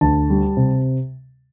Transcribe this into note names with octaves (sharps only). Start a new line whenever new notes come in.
D2 A5
G3
C3